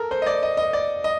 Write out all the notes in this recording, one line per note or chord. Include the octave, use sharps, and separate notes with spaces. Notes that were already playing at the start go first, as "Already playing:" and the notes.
Already playing: A4 A#4
C5
D#5
D5
D#5
D#5
D5
D#5